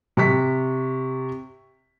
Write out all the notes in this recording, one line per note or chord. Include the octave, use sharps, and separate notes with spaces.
C3 C#6 B6